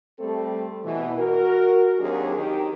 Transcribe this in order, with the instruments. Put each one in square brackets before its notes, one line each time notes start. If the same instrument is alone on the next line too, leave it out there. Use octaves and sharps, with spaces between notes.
[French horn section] G3 A3 C4 A4
B2 E3
F#4 A#4
D#2 F#3 C4 D4 G4 G#4
D#3 G4